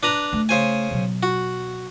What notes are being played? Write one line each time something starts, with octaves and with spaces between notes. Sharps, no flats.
D4 B4 A#5
A3
C#3 C5 G#5
B2 F#3
F#4